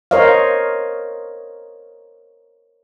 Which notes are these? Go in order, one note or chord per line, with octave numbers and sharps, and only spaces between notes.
A#4 C5 C#5 D#5 F5